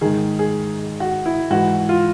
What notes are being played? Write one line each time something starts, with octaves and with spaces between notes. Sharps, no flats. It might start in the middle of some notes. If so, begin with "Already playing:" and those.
G#2 D#3 G#4
G#4
F#4
E4
G#2 E3 F#4
F4